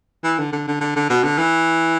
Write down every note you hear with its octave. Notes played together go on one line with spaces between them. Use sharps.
E3
D3
D3
D3
D3
D3
B2
D3
E3